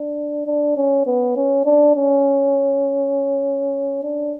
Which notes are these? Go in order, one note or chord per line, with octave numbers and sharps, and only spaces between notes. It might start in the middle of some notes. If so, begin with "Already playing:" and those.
Already playing: D4
D4
C#4
B3
C#4
D4
C#4
D4